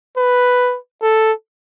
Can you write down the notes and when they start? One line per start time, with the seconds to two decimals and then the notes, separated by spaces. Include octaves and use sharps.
0.17 B4
1.02 A4